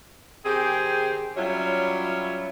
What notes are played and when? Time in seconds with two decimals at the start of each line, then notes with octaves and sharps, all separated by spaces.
0.44 D#3 C4 G4 G#4
1.36 F#3 G3 C#4 E4 F4 C#5